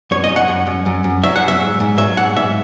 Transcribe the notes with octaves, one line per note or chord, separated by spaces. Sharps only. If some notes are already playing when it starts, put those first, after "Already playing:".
F#2 C#5
D#5
F#2
F#5
F#2
F#2
F#2
F#2
F#3 E5
F#5
F#2
E5
G#2
G#2
F#3 E5
G#2 F#5
G#2 E5